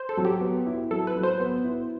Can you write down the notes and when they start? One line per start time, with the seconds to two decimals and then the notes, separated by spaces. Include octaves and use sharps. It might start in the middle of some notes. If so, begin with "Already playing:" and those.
Already playing: C5
0.09 A4
0.17 F#3
0.25 G4
0.41 B3
0.66 E4
0.91 F#3 A4
1.07 B4
1.15 F#3
1.23 C5
1.40 B3
1.64 E4